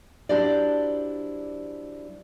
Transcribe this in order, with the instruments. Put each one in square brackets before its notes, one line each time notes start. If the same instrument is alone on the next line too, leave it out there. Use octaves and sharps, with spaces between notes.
[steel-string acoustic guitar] F#3 D4 E4 G4 C5 D5